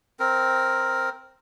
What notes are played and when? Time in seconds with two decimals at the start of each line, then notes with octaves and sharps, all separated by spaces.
0.20 C4 A#4